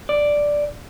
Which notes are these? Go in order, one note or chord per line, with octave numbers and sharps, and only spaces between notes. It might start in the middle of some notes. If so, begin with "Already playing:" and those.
D5